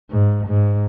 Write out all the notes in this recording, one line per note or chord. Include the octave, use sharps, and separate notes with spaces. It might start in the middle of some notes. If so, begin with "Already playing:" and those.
G#2
G#2